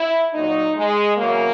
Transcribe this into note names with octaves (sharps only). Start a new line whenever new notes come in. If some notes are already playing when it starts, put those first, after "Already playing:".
Already playing: E4
A#2 F#3 D#4
G#3
E2 C#3 F#3 A#3